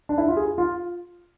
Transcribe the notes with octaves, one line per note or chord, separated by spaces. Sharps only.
D4
E4
F4
G#4
F4